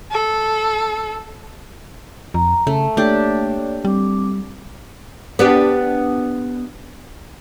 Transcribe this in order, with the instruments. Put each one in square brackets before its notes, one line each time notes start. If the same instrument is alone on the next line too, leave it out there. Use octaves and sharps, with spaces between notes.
[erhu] A4
[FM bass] F2 [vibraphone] A#5
[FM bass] C#3 [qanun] A3 [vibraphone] A5
[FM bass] A3 [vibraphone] A#3 C#5 D5 [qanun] D4 G4
[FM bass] G3 [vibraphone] C4 D6
[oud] B3 D4 G4